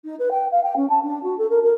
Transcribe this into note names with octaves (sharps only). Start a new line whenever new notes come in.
D#4
B4
G5
F5
G5
C#4
A5
D4
F#4
A4
A#4
A#4